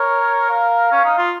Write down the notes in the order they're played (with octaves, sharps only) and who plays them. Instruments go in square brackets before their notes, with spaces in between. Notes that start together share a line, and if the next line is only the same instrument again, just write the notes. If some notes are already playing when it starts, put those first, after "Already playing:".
Already playing: [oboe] A#4 [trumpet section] C#5
[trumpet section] F5
[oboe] C#4
D#4
F4